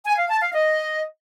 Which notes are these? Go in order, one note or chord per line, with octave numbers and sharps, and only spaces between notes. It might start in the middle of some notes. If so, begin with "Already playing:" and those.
G#5
F5
A5
F5
D#5